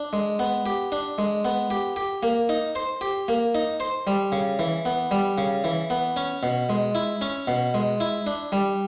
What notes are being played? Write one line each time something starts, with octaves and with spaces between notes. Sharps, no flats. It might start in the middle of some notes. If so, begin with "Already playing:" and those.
Already playing: D4
G#3
B3
G4
D4
G#3
B3
G4
G4
A#3
D#4
C5
G4
A#3
D#4
C5
G3
C#3
E3
B3
G3
C#3
E3
B3
C#4
B2
G#3
E4
C#4
B2
G#3
E4
D4
G3